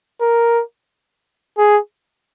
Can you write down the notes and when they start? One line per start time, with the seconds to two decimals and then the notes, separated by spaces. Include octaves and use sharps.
0.21 A#4
1.58 G#4